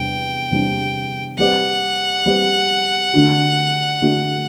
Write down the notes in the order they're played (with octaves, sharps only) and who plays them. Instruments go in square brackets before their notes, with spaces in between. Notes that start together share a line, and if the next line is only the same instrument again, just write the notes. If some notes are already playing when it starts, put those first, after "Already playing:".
Already playing: [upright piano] E2 C3 G3 D4 [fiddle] G5
[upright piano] E2 C3 G3 D4
[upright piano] G3 C4 G4 B4 D5 [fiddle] F#5
[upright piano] G3 C4 G4 B4 D5
D3 A3 D4 F#4
D3 A3 D4 F#4